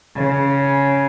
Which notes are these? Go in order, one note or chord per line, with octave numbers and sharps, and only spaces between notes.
C#3